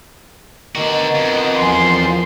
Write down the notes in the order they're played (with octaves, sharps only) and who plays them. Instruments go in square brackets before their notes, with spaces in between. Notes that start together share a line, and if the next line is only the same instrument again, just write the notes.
[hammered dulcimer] B2 D#3 [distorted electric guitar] D3 F#4
[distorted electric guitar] F2 [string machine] D#5 F#5
[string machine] E2 F3 [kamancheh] G#5 C6